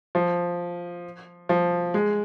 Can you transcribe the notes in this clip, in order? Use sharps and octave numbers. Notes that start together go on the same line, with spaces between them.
F3
F3
G#3